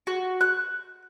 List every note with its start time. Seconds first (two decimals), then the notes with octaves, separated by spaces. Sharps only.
0.07 F#4
0.41 F#6